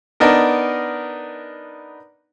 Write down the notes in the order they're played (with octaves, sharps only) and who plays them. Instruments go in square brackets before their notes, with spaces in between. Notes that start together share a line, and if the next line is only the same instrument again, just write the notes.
[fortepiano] B3 D4 D#4 A#4